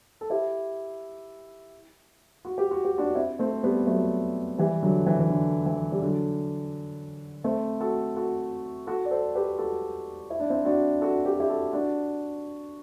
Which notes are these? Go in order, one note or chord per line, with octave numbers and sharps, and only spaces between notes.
A4
E4 G4
F#4
G4
F#4
G4
D4 F#4
D4
C4 E4
A3 C4
G3 B3
F#3 A3
E3 G3
D3 F#3
E3
E3
D3
E3
G3
D3 F#3
A3 C4
F#4 A4
F#4 A4
F#4 A4
D5
A4 C5
G4 B4
F#4 A4
E4
D4
C4 E4
D4 F#4
F#4 A4
G4
F#4
E4 G4
F#4 A4
D4 F#4